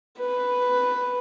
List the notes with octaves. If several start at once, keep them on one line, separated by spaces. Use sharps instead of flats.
B4